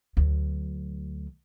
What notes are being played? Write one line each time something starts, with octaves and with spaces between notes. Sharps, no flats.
D2 F#3